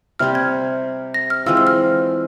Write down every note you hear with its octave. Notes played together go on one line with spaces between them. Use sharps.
C3 G3 C4 G4 F6
G#6
A#6
F6
E3 G#3 C4 F4 E6
E6
F6